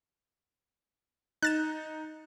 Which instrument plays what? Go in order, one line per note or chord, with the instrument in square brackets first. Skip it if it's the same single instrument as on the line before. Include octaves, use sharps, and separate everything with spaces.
[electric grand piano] D#4 [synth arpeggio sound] F#6 A6 E7